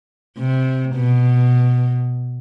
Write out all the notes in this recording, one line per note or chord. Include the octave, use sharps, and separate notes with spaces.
C3
B2